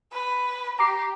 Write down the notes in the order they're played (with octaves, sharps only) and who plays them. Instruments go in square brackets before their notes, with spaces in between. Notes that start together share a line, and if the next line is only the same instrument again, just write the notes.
[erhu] B4
[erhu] G4 [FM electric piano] A#5 D6 C7